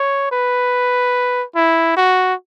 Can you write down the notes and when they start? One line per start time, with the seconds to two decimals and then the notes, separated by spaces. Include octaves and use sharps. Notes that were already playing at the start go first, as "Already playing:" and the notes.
Already playing: C#5
0.32 B4
1.55 E4
1.96 F#4